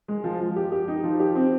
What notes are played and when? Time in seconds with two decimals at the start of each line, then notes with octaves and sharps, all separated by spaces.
0.08 G#3
0.24 F3
0.40 F3
0.56 G4
0.72 G4
0.88 D#4
1.04 F3
1.20 G4
1.35 C4